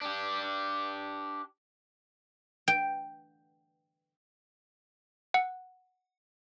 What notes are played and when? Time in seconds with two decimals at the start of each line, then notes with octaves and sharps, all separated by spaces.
0.01 D4 G4
2.68 G5
5.34 F#5